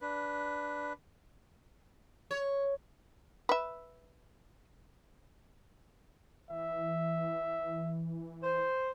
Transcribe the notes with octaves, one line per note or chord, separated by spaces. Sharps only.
D4 B4
C#5
B4 E5
E3 E5
C5